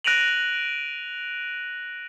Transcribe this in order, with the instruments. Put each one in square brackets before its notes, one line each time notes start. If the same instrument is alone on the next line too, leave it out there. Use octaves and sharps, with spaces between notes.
[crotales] F#6 A#6 D7 D#7 F7 F#7